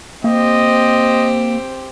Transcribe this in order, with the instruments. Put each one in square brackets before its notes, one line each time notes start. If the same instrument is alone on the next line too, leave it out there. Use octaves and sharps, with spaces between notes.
[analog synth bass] A#3 [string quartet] C4 G4 C5 [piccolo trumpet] D#5